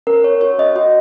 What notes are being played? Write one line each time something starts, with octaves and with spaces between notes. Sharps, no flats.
C#4 A#4
C#4 C#5
F#4 C#5
C#4 D#5
F#4 D#5